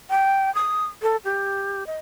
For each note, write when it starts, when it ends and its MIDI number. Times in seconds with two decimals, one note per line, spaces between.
0.10 0.53 79
0.55 0.85 87
1.02 1.16 69
1.25 1.86 67
1.87 1.98 75